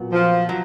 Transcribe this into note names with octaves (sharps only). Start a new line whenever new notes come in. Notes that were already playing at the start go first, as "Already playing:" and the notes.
Already playing: A#2 F#3 B3
F3
F#3